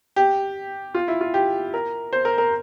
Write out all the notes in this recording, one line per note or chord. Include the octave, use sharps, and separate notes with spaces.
G4
F4
E4
F4
G4
A#4
C5
A#4
A#4